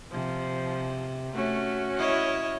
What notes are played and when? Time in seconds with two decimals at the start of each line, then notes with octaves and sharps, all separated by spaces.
0.12 C3 F3
1.35 A3 C#4 F#4
1.97 E4 C#5 D#5